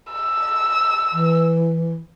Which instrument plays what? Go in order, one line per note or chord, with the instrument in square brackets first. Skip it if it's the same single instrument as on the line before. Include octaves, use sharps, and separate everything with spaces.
[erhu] E6
[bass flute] E3